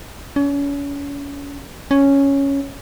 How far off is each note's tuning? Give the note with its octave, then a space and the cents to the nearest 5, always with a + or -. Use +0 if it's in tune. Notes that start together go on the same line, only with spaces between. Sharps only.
C#4 +35
C#4 +0